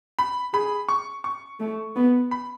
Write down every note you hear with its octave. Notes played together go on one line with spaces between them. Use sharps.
B5
G#4 B5
C#6
C#6
A3
B3
B5